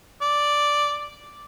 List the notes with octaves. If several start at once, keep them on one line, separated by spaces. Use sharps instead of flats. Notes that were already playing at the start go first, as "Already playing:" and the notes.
D5